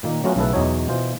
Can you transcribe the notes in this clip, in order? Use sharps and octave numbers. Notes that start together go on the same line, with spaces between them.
A#2 D#3 A#3
F#3 A3 B3 C#4 F4 F#4
B1 C#3 A3 E4 A4 B4
E2 B2 E3 F#3 D#4 C#5
B2 E3 F4 C5